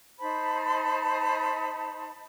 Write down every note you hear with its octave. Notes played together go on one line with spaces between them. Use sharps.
D#4 C5 A5 B5